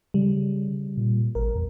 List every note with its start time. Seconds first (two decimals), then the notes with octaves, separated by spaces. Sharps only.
0.14 C#3 G3
0.97 A#2
1.35 A1 A#4
1.55 E2